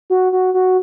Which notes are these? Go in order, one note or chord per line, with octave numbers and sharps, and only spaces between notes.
F#4
F#4
F#4